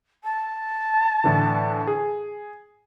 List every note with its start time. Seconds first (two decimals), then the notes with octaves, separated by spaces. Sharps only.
0.24 A5
1.24 A2 D3 E3
1.87 G#4